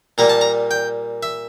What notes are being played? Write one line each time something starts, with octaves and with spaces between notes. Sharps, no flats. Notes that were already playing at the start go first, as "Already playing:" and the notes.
A#2 G3 A#3 A#5
A5
A#5
G5
E5